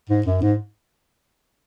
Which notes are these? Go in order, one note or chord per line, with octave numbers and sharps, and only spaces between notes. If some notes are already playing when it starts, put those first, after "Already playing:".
G#2
F#2
G#2